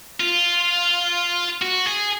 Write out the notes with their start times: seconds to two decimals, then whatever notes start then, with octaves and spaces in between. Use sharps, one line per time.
0.20 F4
1.62 F#4
1.86 G#4